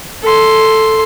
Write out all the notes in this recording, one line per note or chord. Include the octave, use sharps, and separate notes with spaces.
A4 C6